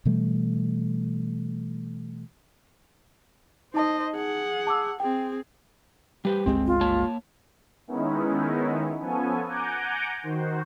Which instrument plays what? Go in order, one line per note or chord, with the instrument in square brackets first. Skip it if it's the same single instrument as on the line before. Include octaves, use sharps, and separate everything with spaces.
[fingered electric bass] B2 E3 G3 A3
[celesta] D#4 A5 [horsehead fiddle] C5 D#5
[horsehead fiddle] G#4 F#5
[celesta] A5 D6 E6
[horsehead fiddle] C4 G#4 [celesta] G5
[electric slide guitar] G3 B4 C5 [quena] G4
[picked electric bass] G1 C#2 G#3 [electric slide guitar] C4
[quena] F4
[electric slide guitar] A#3 C#5 A5
[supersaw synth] D#3 G#3 B3 C#4 D#4 E4
F3 B3 C#4 A4 G#5
F#5 G#5 A#5 D6 G6
D#3 F#4 C5